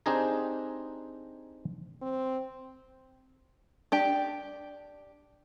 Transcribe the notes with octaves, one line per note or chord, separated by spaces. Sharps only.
C4 D4 D#4 G4 G#4 A#5
C4
D4 G4 G5